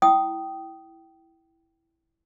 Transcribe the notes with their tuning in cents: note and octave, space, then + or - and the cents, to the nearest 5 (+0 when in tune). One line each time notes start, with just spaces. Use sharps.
E4 +0 G5 -15 D#6 +0